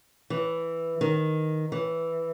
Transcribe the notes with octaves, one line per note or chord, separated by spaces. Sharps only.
E3
D#3
E3